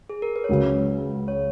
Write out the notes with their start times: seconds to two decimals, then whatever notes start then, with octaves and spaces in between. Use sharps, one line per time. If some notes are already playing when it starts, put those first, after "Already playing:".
0.09 G#4
0.22 A#4
0.36 B4
0.44 C#5
0.49 C#2 C#3 F#3 B4
1.28 C#5